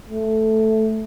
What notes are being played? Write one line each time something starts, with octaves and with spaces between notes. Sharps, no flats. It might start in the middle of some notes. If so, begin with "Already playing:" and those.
A3